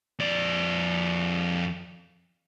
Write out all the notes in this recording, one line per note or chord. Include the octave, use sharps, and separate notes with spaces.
F2 D5